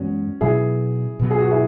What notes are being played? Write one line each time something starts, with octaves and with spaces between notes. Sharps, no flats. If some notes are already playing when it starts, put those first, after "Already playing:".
Already playing: F#2 E3 G#3 B3 C#4 F#4
B2 F#3 B3 E4 G#4
B2 F#3 B3
G#4
F#4
E4 G#4